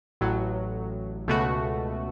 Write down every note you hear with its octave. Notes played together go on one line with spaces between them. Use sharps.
A1 A2 F#3
C#2 B2 A3 F#4